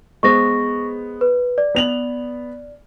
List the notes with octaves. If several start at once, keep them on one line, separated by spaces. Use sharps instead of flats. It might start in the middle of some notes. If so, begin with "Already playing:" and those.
G#3 B3 C5 C#6 A#6
B4
D5
B3 F7 F#7